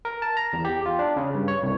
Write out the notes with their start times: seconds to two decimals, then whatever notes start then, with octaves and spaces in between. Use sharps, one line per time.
0.05 A#4
0.22 A5
0.37 A#5
0.53 E2
0.65 G4
0.86 F4
0.99 D4
1.16 C#3
1.35 G2
1.48 C#5
1.63 C2